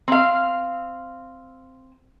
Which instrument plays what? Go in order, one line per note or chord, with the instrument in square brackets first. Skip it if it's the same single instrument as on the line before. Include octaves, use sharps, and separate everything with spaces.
[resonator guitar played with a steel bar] C4 F5